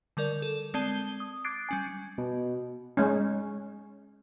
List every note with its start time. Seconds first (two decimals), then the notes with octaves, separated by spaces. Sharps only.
0.17 D3 G3 A#4 D5
0.42 A4
0.74 G#3 C4 D5 A5 D#7 G7
1.20 D#6
1.45 D6 F#6 G#6 A6 C7 D7
1.69 G3 C#4 G#5
2.18 B2
2.97 G#3 C#4